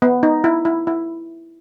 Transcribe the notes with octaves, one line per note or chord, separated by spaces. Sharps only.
B3
D#4
E4
E4
E4